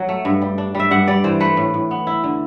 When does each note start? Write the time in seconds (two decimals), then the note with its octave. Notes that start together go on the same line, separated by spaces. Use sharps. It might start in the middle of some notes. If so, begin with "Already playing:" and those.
Already playing: F#3 F#5
0.09 A3
0.25 G2
0.42 G3
0.58 D4
0.75 G3 E5
0.91 G2 F#5
1.08 G3 D5
1.24 E3 C5
1.40 A3 B4
1.57 A2
1.74 A2
1.91 B3
2.07 E4
2.24 D3